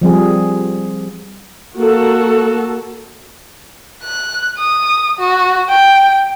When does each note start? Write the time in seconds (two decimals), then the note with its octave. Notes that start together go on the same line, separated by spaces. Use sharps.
0.01 F3 G3 C4 G#4
1.77 A#3 F#4 A4
4.04 F#6
4.59 D#6
5.19 F#4
5.69 G5